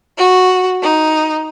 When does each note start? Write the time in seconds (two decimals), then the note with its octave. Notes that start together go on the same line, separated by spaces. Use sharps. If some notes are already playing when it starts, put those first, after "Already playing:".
0.18 F#4
0.82 D#4